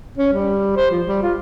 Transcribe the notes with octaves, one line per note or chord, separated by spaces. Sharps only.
C#4
G3
C5
F3
G3
F4